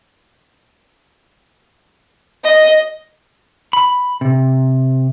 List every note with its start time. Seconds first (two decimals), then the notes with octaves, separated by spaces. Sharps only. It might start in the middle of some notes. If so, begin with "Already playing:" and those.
2.44 D#5
3.73 B5
4.21 C3